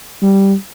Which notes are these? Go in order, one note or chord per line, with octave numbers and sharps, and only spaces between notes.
G3